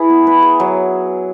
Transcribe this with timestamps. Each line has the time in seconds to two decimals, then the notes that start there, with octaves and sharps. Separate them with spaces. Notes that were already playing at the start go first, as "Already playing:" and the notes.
Already playing: E4 G#4 B4
0.10 B3
0.27 B4
0.42 G#4
0.60 F#3